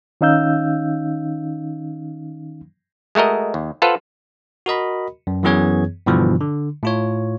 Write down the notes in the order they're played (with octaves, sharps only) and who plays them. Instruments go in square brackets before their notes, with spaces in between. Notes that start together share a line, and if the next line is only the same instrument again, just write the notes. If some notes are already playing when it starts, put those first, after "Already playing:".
[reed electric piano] D#3 C#4 D#4 F5 E6 G6
[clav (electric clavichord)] G#3 A3 F#4 A#4 D#5
D#2
F4 A4 B4 C5 F5 F#5
[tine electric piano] F#4 A#4 D#5 B5
F#2
F#2 E3 B3 G#4 C#5 G#6
G2 B2 D3 E3 F3
D3
A2 F4 C#5